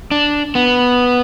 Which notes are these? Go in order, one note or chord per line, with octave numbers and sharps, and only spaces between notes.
D4
B3